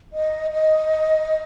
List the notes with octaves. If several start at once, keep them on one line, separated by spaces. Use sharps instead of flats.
D#5
D#5